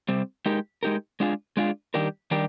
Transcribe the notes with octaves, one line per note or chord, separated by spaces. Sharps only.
C3 G3 C4
G#3 D#4 G4 A#4
G#3 D#4 G4 A#4
G#3 D4 F4 G#4
G#3 D4 F4 G#4
D#3 G3 D4 G4 A#4
D#3 G3 D4 G4 A#4